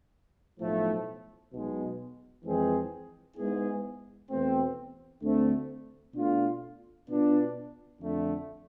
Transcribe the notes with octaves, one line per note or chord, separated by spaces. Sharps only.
B1 A2 F3 A3
B1 B2 G#3
F2 E3 G#3 C4 G#4
G#2 G#3 B3 E4 G#4
E2 B2 A3 C4
D2 D3 A3 C4
B2 A3 D4 F4
B2 B3 D4 F4
F2 D3 A3